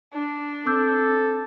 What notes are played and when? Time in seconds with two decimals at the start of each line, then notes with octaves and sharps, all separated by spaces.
0.13 D4
0.66 C4 A4 D6 E6 G6